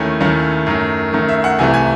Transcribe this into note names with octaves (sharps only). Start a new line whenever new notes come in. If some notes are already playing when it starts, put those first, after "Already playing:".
Already playing: D#2 D#3 A3 C#4 E4 G#5
D#2 D#3 A3 C#4 E4
F#2 D#3 A3
F#2 D#3 A3
E5
F#5
C2 C3 E3 A3 G#5
G#5